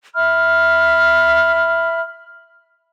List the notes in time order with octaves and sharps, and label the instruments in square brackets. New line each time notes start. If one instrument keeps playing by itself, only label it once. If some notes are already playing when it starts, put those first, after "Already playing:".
[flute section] E5 B5 F6